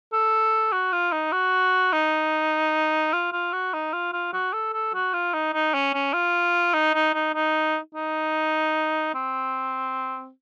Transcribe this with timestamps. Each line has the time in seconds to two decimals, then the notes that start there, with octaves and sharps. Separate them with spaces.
0.13 A4
0.72 F#4
0.92 F4
1.12 D#4
1.32 F#4
1.92 D#4
3.13 F4
3.33 F4
3.53 F#4
3.73 D#4
3.93 F4
4.13 F4
4.33 F#4
4.53 A4
4.73 A4
4.94 F#4
5.14 F4
5.33 D#4
5.54 D#4
5.74 C#4
5.94 C#4
6.13 F4
6.73 D#4
6.94 D#4
7.14 D#4
7.34 D#4
7.95 D#4
9.15 C4